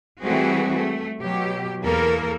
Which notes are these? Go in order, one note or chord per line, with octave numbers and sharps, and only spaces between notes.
E3 G3 A3 C4 F#4 G#4
A3
B2 F#3 G4
E2 A#3 A4 A#4